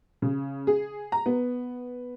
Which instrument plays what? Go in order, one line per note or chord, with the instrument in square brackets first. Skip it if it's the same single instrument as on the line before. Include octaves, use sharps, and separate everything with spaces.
[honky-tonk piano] C#3
G#4
A#5
B3